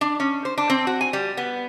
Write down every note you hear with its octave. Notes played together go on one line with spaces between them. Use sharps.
D4
C#4
C5
D4
C4
F#4
G#5
G3
B3